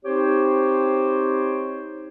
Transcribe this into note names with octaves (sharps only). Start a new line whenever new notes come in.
C4 D#4 G4 C5 C#5